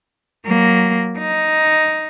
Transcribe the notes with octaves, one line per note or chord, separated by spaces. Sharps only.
F#3 A#3
D#4